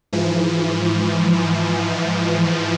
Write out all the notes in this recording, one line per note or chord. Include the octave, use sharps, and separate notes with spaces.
G#2 E3 F3